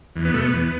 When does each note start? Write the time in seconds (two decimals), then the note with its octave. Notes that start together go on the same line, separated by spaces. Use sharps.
0.16 E2
0.25 B3
0.34 B2 A3
0.44 B3
0.53 E2